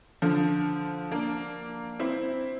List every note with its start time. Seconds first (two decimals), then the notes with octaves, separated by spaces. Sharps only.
0.22 D3 F3
1.11 A#3 D4
2.00 C4 E4